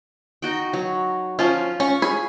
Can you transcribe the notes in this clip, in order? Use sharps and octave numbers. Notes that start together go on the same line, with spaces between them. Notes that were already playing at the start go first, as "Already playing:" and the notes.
D#4 F#4 G5
F#3
F3 C#4 F4
C#4 C#6
G#4 G#5 B5